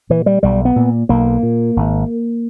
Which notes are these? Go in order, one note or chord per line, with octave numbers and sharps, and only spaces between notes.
A#2 E3
G3
B1 G3
B3
A#2
B1 A#3
A#2
G#1